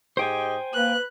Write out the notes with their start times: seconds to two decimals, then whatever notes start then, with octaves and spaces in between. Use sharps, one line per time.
0.17 G#2 G4 C5 D#5 G5 G#5
0.74 A#3 B4 F#6